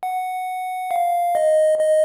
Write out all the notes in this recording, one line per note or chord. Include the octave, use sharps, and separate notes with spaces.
F#5
F5
D#5
D#5